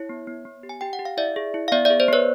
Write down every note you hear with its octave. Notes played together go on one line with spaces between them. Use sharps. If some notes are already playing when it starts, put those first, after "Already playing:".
Already playing: E4 C#5
B3
B3
B3
G4
G#5
G4 G5
F#5
G4
F5
E4 D5 E5
G#4
E4
F5
B3 D5 E5
G#4 D5 E5
C5 D5
B3 B4 C#5